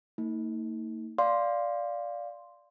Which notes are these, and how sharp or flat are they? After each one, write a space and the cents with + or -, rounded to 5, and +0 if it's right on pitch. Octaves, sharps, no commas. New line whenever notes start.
A#3 -45 D#4 +40
D5 -5 F5 +0 C6 +0